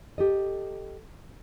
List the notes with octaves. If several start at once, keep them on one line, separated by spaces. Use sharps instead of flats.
G4 A4 D#5